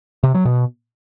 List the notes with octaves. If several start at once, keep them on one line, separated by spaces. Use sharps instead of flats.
C3
F#3
B2